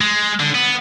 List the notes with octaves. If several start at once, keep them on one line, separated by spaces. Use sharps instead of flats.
G#3
D3
B3